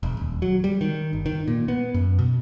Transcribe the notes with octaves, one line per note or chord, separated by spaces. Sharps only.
E1
D#1
F#3
G3
D#3
G1
D#3
A#2
B3
F#2
B2